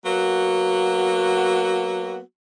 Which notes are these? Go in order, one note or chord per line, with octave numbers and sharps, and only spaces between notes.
F#3 A#3 B3 F#4